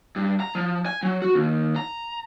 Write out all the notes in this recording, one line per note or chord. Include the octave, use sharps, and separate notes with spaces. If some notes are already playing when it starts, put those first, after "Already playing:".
G2
A#5
F3
G#5
F#3
F#4
D#2
A#5